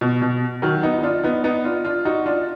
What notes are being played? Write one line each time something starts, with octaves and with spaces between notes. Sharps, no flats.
B2
B2
D#3 F#3
B3 D#4
D#4
D4 F4
B3 D#4
B3 D#4
D4 F4
D4 F4
D#4 F#4
D4 F4